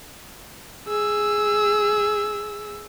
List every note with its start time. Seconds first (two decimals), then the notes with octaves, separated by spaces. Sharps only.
0.88 G#4 E6